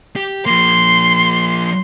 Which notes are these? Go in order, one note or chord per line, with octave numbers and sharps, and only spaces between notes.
G4
F3 A#3 C6